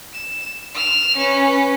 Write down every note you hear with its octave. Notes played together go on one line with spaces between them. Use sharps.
E7
F6 E7
C#4 B4